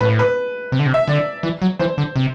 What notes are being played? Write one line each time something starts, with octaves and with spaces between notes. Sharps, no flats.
A2 B4
B4
C3
D3
C3
E5
D3 D5
E3
F#3
E3 C5
D3
C3